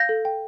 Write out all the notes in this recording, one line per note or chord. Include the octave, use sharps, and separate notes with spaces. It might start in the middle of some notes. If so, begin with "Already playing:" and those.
Already playing: F5 G6 A#6
A4
G5